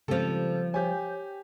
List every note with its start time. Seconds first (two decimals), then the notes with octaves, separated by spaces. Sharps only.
0.08 C#3 F3 G3 G#3 C4 A4
0.74 G4 C#5 G5 G#5 G6